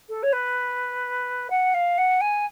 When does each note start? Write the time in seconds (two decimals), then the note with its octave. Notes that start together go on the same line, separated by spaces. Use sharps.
0.09 A4
0.23 C#5
0.33 B4
1.50 F#5
1.74 F5
1.98 F#5
2.21 G#5